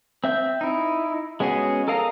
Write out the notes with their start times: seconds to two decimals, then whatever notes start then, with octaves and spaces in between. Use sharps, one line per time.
0.24 C4 E5 G6
0.61 D#4 E4
1.40 G#3 B3 C#4 F#4 G#4
1.88 A4 A#4 D#5 F5 A#5